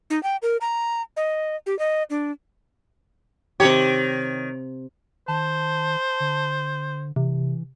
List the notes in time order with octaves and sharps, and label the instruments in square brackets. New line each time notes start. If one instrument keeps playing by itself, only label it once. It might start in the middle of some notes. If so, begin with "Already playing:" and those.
[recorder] D#4
G5
A#4
A#5
D#5
G4
D#5
D4
[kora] C3 G4 [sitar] D#3 C#5
[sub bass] D#3 [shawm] C5 [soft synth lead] A5
[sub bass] D3
[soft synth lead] C3 [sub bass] E3